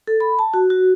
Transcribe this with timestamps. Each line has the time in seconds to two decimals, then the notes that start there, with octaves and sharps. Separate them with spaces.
0.07 A4
0.20 B5
0.39 A5
0.54 F#4
0.70 F#4